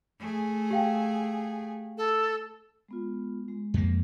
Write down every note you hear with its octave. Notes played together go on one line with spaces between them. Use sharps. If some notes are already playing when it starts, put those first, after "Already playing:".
A3 G#4
G4 F5 G5
A4
G#3 B3 F4
G#3
F2 A#3